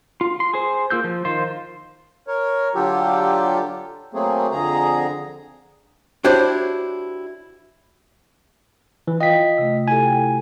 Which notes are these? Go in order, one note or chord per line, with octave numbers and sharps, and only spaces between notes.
F4
C6
G#4 C5
A#3 F4 E6 G6
F3
D#3 F4 C5
A#4 C#5
D3 F#3 F4 G4 A4
F#3 A3 A#3 C4 G#4
F2 D3 G#4 A#5
D4 E4 F#4 G4 C5 C#5
E3
F4 D#5 F5 G5 B6
C3 A3
E4 G4 A4 G#5
G5